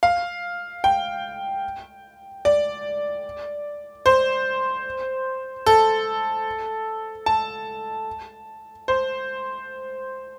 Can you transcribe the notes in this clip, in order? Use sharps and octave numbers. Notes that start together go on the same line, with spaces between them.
F5
G5
D5
C5
A4
A5
C5